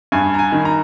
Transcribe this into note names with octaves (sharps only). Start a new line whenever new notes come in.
G2 G#5
A#5
G#5
D#3
A#5